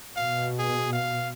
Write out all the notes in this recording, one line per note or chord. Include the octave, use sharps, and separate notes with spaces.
B2 F5
G#4
F5